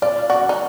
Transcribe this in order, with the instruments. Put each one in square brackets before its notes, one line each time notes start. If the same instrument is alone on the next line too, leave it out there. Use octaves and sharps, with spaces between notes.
[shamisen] F4 [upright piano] D5
[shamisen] F#4 [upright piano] D5
[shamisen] D#4